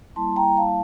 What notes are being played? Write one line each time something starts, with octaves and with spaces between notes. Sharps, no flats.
G3 A#3 E4 A5 C6
G5 A#5
F5 A5